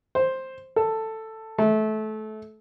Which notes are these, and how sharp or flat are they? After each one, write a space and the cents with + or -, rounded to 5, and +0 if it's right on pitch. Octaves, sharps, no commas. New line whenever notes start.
C5 +5
A4 +10
A3 -25